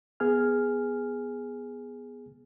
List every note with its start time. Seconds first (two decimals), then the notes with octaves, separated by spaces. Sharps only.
0.20 B3 G#4 G#5 F6